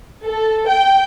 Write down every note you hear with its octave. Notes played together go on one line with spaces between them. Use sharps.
A4
G5